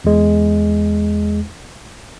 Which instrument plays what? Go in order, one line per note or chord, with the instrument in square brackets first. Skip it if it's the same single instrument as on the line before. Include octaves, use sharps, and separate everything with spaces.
[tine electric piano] E2 G#3